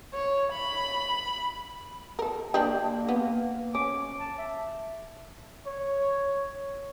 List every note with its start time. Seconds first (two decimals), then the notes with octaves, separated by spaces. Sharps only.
0.14 C#5
0.52 B5
2.19 A4 A#4
2.54 D3 A#3 D4 G4
3.09 B3
3.75 C#4 D6
4.19 A5
4.38 E5
5.67 C#5